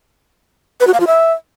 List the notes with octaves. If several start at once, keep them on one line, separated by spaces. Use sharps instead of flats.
B4
F#4
F5
F4
E5